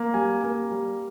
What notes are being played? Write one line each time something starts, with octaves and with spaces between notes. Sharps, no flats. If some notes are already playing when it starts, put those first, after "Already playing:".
Already playing: A#3
G3 G#5
A#3
G3